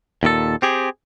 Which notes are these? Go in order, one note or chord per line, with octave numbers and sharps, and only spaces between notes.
D#2 A#2 A4
C4 G4 G#4